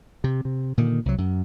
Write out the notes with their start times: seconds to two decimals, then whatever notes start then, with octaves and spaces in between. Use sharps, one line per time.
0.24 C3
0.45 C3
0.78 A#2 D3 D#3
1.05 C2 F#3
1.18 F#2